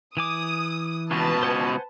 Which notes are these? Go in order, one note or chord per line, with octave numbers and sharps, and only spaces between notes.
E3 G#5 D6 D#6
C#2 B2 B4 A5
C5 F#5 G#5